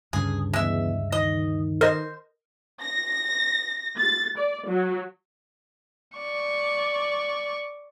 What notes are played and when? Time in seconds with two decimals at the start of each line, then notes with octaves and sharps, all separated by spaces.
0.13 D2 G2 C#3 G#4
0.53 E2 G#3 E5
1.12 D#3 D#5
1.81 A#4 C5 D#5
2.81 A#6
3.98 A6
4.38 D5
4.68 F#3
6.18 D5 C#6